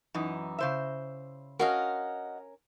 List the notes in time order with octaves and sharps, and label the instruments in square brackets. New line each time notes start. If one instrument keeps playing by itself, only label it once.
[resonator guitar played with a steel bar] F#2 E3 D#4
C#3 C5 E5
[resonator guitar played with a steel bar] C#4 A#4 [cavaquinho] F#4 D#5 F5